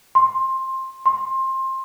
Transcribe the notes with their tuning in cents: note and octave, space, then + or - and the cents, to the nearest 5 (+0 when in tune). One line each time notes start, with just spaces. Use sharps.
C6 +15
C6 +20